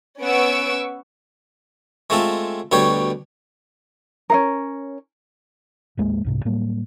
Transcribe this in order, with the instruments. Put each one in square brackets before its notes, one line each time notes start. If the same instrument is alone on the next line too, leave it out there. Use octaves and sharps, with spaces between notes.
[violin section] B3 C#4 F#5 C#6 E6 D7
[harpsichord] G#3 A3 C4 F4 A4
D2 B2 G3 C#5 G5
[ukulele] C#4 D#4 A#4
[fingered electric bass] A1 D#2 G#3 A#3
C2 G#2 C3
A2 F#3 G3 A#3